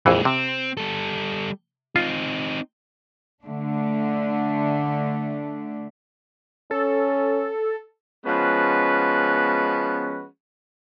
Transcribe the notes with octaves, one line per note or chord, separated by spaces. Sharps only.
A#1 F2 A#2 E3 G#3
C3 C4
G3 A4
C4 D#4 F4
D3 A3 D4
C#4 A4
F3 G#3 B3 C#4 F#4 B4